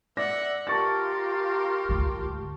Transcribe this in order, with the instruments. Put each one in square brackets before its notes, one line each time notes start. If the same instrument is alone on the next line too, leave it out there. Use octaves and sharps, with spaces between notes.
[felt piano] D5 A#6 [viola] E5 F#5
[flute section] F4 A#4 [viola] G4 [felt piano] A5 C#6 A6
[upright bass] D2 G#2